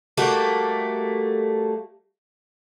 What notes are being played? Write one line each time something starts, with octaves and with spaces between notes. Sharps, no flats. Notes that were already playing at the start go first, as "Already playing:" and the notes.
G3 A3 A#3 F#4